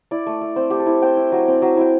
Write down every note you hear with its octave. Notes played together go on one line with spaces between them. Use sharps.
E4 D5
A3
A3
C4 C5
A3 G4
A4
E4
C4 G5
E4
F#3
C4
F#3
E4 G5